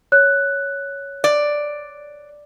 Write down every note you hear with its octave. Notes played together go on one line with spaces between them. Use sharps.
C#5 F#6
D5